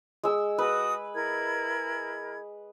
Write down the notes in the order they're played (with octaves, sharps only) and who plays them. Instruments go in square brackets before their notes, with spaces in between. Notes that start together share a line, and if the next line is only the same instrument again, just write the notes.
[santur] G#3 E6
[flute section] F#4 D#6 [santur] B4
[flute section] E4 A#4 G#6